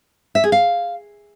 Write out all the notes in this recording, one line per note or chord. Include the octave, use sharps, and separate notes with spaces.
E5
G#4
F5